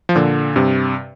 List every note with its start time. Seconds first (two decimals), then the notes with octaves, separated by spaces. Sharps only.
0.09 F3
0.15 A#2 D3
0.56 G2 C3